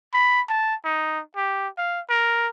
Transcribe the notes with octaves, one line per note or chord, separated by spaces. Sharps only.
B5
A5
D#4
G4
F5
A#4